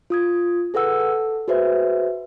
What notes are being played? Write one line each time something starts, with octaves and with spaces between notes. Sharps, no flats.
F4 D#6 G#6
G#4 A4 B4 F#5 E6
A4
F#4 G#4 B4 C5 E5